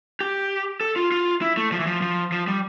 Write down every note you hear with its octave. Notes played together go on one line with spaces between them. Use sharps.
G4
A4
F4
F4
E4
A3
F3
E3
F3
F3
F3
G3